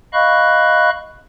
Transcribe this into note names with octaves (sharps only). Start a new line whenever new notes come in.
D#5 F5 B5 C#6 F#6